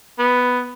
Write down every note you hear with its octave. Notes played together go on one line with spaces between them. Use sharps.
B3